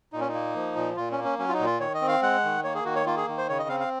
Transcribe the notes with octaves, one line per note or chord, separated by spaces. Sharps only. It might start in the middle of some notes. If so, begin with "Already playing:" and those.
A#2 D#4
C#4
D#4
A#3
F3
A#2
A#2 F4
C#4
A#3
C#4
F#3 C#4
F4
D#4
A#2
F4
D#3 C#5
D#5
C4
F5
G#3 F#5
D#3
A#3 C#5
G#4
D#3 F#4
C#5
A#3 F4
G#4
D#3
C5
C#3 C#5
D#5
C4 F5
F5